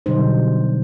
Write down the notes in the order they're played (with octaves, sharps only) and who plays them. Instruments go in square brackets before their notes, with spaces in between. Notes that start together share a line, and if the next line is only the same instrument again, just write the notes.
[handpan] B2 D3 F#3 G3 D#4 C5